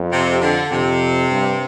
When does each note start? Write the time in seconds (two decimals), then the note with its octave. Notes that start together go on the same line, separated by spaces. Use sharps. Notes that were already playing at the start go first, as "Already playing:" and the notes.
Already playing: F2
0.12 C3
0.42 D3
0.71 F2 C3
1.30 G2